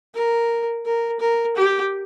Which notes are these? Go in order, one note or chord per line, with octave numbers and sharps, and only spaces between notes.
A#4
A#4
A#4
G4